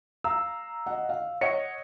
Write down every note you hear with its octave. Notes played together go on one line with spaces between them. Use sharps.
F5 A#5 E6
D#5 F#5
F5
C#5 D#5 F#5 C#7